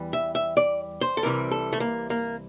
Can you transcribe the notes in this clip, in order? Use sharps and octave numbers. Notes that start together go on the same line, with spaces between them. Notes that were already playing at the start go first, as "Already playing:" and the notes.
Already playing: E2 E3 G3
E5
E5
D5
C5
A4
C2 C3 E3 G3 A#4
A4
A3
A#3
A#3